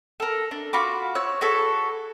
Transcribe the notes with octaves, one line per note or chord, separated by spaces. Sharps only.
A4 A#4
D4
F4 F#4 B5 D6
C#5 E6 F#6
F#4 G#4 A4 B4